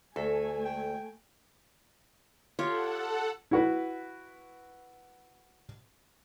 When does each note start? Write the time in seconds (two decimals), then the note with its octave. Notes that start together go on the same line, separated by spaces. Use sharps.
0.16 D2 A3 A4 G#5
0.64 G5
2.59 F4 G4 A4 C#5 F#5
3.51 E4 F#4 B4